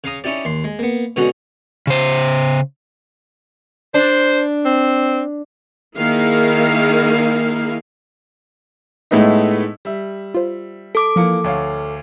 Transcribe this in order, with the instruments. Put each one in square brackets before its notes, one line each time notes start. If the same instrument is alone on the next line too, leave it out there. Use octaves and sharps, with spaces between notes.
[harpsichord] C#3 F5 A#5 D#6
C#4 D#4 E4 G4 D5
D#2 C6
G#3
A#3 B3
B2 D3 G#3 C#4 D#4 F#4
[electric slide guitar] C#3 C5
[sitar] D4 [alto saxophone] C5
[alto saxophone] C4
[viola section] D#3 A#3 E4 G#4 F5
[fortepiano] A2 G#3 A3 B3 D#4
[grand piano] G3 E5
[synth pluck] F4 C5
[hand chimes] A4 D6
[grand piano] E3 A#3 C#7 [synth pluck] F3
[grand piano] D2 C#5 F5